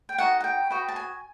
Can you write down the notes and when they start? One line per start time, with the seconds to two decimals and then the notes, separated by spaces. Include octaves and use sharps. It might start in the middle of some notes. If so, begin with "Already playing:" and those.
0.09 G5
0.18 D#4 F#4 A4 F#5
0.40 F#5
0.44 G5
0.70 F#4 B4 D#5 G5
0.88 A5
0.96 G#5